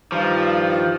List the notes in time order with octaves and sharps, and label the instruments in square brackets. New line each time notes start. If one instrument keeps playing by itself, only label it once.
[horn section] G2 D#3 [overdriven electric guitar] F3